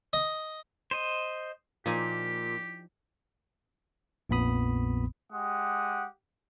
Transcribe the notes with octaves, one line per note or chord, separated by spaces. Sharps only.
D#5
C5 D#5
A#2 F3 D#4 G4 G#5
A#1 F2 A#2 B3 B5 D#6
G#3 G4 F#5 D#6